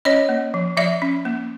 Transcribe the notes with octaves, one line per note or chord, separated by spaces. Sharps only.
C#4 C#5 D#5
A#3
F3
F3 D5 E5
C#4
A#3